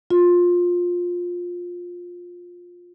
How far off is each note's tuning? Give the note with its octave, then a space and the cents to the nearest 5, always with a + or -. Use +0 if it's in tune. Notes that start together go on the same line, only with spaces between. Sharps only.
F4 +15